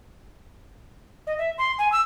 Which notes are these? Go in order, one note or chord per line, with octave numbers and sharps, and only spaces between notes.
D#5
E5
C6
G#5
E6